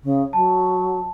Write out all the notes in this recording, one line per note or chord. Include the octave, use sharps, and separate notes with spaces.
C#3
F#3 A5